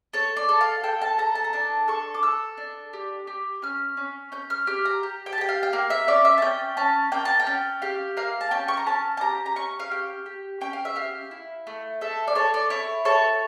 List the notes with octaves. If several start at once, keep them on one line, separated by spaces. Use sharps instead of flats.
A4 C#5
D5
A4
F5
A4 G5
A5
A4 A#5
A5
A#5
D4 A5
A4 C#6
D6
A4 E6
D4
G4
G4
C#4 F6
C#4
C#4 G6
F6
G4 F6
A#5
G4
G5
A5
G4 G5
F5
G5
A#3 F5
E5
C#4 D5
E5
A5
C#4 G5
C#4 A5
A#3 G5
A5
G5
C#4
G4 F5
A#3 F5
A5
C#4 G5
C#6
A#5
C#4 A5
A5
G4 A#5
A#5
C#4 C#6
F5
G4 G5
G4
C#4 G5
F5
E5
G4 F5
E4
A3
A4 E5
D5
A4 C#5
D5
E4 C#5
A4 C#5